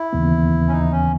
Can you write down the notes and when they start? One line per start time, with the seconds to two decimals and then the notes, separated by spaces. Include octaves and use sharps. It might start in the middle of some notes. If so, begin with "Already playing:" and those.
Already playing: E4
0.13 D#2 C#3 E3 B3
0.68 C#4
0.72 D#4
0.91 C#4